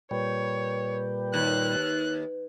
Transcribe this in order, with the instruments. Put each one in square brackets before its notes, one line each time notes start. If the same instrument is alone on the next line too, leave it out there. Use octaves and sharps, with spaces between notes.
[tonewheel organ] A#2 G3 [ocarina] B4 [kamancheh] C#5
[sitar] D#2 [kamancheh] F#6